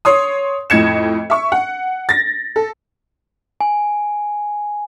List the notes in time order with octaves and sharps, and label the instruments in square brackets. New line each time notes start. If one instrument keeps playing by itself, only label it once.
[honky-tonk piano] C#5 C6 D#6
F2 A2 D#5 G#6 C#7 E7
E5 C#6
F#5
A6 A#6
A4
[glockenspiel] G#5